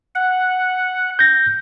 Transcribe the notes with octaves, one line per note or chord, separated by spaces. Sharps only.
F#5
G6 A#6